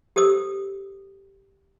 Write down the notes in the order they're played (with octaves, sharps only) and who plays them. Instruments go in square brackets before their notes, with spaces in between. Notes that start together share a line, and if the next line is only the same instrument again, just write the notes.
[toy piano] G4 A4 C5 D#6 E6